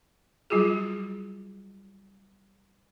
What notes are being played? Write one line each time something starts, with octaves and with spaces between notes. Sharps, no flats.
F#3 G3 F4 F#4 G#4